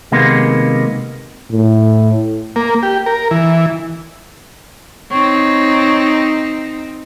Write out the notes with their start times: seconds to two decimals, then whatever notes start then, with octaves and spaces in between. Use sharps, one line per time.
0.12 C3 D#3 G#3 A#3 B3
1.50 A2
2.56 A#3
2.83 G4
3.06 A#4
3.31 E3
5.12 C4 D#4 C#5